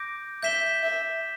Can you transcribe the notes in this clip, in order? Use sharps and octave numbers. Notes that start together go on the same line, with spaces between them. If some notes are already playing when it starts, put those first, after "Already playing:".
Already playing: D6 G6 A#6 D7
E5 G6 B6 E7 G7
E5